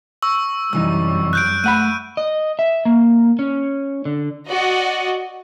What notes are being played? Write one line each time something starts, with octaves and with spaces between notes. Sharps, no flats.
C#6 E6
C2 F#2 E3 G3 D#4 E6
F#6 G6 D7
A3 F#5 B5 D#7
D#5
E5
A#3
C#4
D3
F#4 D5 D#5